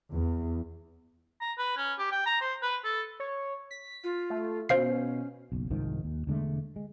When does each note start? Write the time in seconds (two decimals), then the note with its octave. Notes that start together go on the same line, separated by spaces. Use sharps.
0.14 E2
1.41 A#5
1.58 B4
1.77 C#4
1.99 G4
2.11 G5
2.26 A#5
2.41 C5
2.62 B4
2.84 A4
3.20 C#5
3.71 B6
4.04 F4
4.30 A3
4.69 B2 C#4 C5 F5 C7
5.52 F#1 B1
5.70 C2 G#2 D#3 F3
6.04 D#2
6.27 E1 D3 G#3 A3
6.76 G#3